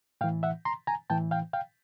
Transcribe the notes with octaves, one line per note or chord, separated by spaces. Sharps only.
A2 E3 F5 G5
E5 F#5
A#5 C6
G#5 A#5
A2 E3 G5 A5
F5 G5
F5 G5